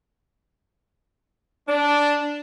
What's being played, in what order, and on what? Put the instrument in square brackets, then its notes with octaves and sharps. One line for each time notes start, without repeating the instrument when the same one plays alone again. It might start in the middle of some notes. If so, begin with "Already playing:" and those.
[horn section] D4